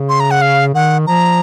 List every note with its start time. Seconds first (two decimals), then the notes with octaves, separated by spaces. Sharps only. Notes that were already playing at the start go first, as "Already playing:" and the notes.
Already playing: C#3
0.09 C6
0.20 A#5
0.31 F#5
0.42 F5
0.74 D#3 F#5
1.07 F3 A#5